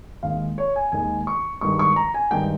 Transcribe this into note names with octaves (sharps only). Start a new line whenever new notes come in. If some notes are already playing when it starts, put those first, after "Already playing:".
D#2 D#3 G#3 F5
C#5
G#5
D#2 D#3 G#3 G#5
C#6
G2 D#3 G#3 C#6
C#6
A#5
G#5
G2 D#3 G#3 G5